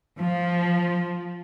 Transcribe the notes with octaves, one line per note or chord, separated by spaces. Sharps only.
F3